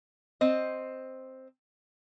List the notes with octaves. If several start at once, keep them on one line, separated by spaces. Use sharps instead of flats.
C4 C5 D#5